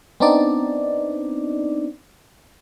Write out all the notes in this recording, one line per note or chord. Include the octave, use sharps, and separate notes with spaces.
B3 C4 D4 D#4 D5